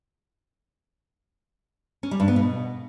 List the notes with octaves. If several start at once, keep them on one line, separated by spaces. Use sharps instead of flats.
C#4
G3
G2
B3
B2